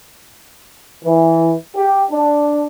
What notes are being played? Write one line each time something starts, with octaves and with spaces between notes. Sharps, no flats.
E3
G4
D4